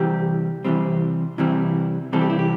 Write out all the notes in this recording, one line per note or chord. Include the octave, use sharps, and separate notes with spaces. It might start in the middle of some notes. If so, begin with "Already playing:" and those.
Already playing: C3 E3 G3 C4 G4
C3 E3 G3 C4
C3 E3 G3 C4 E4
C3 E3 G3 C4 A4
G4
E4
G4